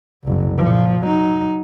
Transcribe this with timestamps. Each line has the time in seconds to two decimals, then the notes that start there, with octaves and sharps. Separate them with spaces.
0.24 F#1 C2
0.58 A#2 F3
1.03 F#3 D#4